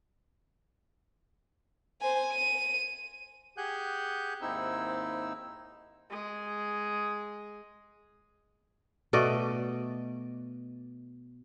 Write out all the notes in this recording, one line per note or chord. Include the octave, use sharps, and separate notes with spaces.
C5 G#5
D#7
G4 G#4 F#5 G#5 F#6 G6
D#2 G#2 C4 D#4 E4 E6
G#3 G#4
B2 A3 D5 D#5